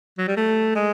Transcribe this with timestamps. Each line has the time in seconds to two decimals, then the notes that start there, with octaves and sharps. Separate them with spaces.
0.18 F#3
0.28 G3
0.37 A3
0.76 G#3